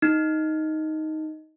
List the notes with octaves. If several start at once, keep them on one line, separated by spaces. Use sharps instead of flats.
D#4